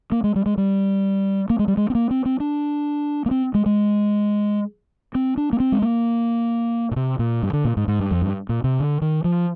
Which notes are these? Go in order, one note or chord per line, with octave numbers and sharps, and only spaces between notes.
A#3
G#3
G3
G#3
G3
A#3
G#3
G3
G#3
C4
A#3
C4
C4
D4
A#3
C4
G#3
G#3
C4
D4
A#3
C4
G#3
A#3
A#2
C3
A#2
G2
D3
A#2
G#2
G#2
G2
F2
G2
A#2
C3
D3
D#3
F3